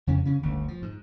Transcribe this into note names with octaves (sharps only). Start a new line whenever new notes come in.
F2 C#3 C#4
C#3 C#4
G1 D2
F3
G#2